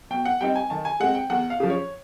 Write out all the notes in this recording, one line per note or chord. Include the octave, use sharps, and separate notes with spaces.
B2 G5
F#5
G3 C4 D#4 G5
G#5
D#3 A5
G#5
G#3 C4 F#5
G5
E2 F#5
F5
C#3 F3
C#5